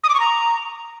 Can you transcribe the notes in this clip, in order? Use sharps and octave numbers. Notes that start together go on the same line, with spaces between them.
D#6
D6
C#6
A#5